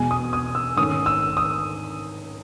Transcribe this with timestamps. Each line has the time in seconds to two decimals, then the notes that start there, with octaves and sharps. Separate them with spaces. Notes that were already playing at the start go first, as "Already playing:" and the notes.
Already playing: E2 B2 G#3 B3 G#5
0.11 D#6
0.33 D#6
0.55 E6
0.76 G#2 D#3 A3 C#4 D#6
1.06 E6
1.37 D#6